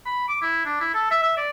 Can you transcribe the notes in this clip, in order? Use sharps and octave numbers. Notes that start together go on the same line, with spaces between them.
B5
D6
E4
D4
E4
A4
E5
E5
D5